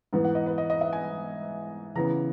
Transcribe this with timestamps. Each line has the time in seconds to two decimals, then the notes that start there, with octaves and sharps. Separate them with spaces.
0.13 G#2 E3 B3
0.25 F#5
0.35 D#5
0.46 B4
0.58 D#5
0.70 D#5
0.81 E5
0.93 G#5
1.95 C#3 E3 B3 A#5